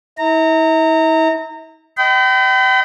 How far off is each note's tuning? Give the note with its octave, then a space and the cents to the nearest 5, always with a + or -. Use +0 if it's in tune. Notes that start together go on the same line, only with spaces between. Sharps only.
E4 -40 A#5 -25
D#5 +0 G5 -35 B5 +40